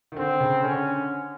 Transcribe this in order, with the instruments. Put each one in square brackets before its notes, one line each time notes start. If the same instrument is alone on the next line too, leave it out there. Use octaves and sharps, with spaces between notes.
[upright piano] D#3
[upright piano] D3 [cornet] C4
[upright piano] C#3
[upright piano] D3 [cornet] C#4